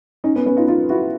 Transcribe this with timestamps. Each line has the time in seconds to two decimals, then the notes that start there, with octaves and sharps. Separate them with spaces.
0.24 C#4 D#4
0.35 B3 C#4
0.46 B3 C#4
0.57 D#4 F4
0.68 D#4 F4
0.89 E4 F#4